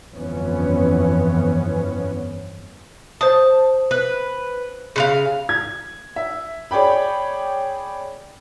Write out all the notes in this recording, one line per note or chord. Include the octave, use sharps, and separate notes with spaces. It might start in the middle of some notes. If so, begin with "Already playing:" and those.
G1 F2 E3 B3 C#4
C5 A5 D#6
B4
C#3 B4 F5
G#6
E5
G#4 C#5 D5 G5 B5